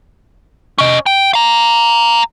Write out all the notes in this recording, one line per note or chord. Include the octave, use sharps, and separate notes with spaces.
C#4 D#5
G5
F5 A#5